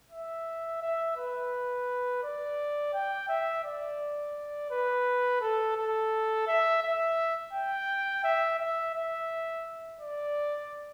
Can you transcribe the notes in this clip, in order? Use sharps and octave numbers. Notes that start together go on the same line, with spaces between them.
E5
E5
B4
D5
G5
E5
D5
B4
A4
A4
E5
E5
G5
E5
E5
E5
D5